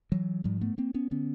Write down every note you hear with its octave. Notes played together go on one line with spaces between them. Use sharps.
E3 F#3
G#2 F3 G3
A3 B3
A#3 C4
B3 C#4
D3 B3 C#4